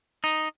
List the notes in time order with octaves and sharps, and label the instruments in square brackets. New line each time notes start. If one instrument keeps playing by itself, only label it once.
[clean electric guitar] D#4